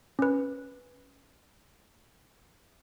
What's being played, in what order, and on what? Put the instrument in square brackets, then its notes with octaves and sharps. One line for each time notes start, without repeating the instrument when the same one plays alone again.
[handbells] C#4 B4